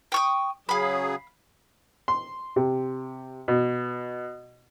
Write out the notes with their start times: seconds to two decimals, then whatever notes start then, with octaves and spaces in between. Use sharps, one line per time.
0.12 G5 C#6 D#6
0.69 C#3 F#3 G#4 F5 B5
2.08 C6
2.56 C3
3.48 B2